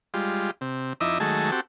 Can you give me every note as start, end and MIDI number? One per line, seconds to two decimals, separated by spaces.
0.14 0.51 55
0.14 0.51 56
0.14 0.51 65
0.61 0.93 48
1.01 1.18 41
1.01 1.18 63
1.01 1.18 64
1.01 1.18 75
1.01 1.18 76
1.01 1.18 86
1.20 1.51 51
1.20 1.51 54
1.20 1.51 56
1.20 1.51 57
1.20 1.51 68
1.20 1.51 69
1.52 1.61 60
1.52 1.61 66
1.52 1.61 67
1.52 1.61 69